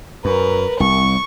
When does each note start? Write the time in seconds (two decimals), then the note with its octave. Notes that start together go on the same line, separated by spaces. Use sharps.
0.25 F#2 A#4 B4
0.80 C2 C#6